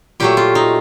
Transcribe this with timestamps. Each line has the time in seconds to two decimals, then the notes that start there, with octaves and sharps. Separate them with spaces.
0.20 A#2 F#3 A3 G4
0.37 F4
0.55 D#4